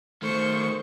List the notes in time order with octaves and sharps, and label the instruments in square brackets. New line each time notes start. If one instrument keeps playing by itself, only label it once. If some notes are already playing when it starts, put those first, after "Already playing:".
[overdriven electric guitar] D#3 A3 [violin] C5 C#6